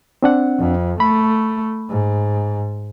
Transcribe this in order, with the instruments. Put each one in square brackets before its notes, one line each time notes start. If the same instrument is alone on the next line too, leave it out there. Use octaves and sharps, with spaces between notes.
[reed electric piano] C4 D4 F#5
[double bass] F2
[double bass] A3 [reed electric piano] B5
[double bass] G#2